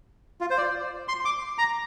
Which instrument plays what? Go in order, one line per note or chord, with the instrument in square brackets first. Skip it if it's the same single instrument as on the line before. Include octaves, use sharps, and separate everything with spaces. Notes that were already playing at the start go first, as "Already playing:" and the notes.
[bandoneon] F4
C5
D5
C6
D6
A#5